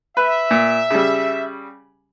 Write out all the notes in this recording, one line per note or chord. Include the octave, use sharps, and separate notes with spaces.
B4 E5
A#2
C#3 G3